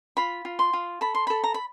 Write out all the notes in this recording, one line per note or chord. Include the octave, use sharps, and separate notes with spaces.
F4 B5
F4
C6
F4
A4 B5
C6
A4 B5
A#5
B5